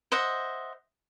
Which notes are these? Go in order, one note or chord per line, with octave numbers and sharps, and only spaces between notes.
C5 D#5 E5 F#5